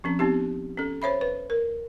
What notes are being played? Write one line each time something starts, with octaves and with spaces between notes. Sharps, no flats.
F3 C4 C#4
B3 C4 D#4 G4
C#4 A4
C5 C#5 E5 B5
B4
A#4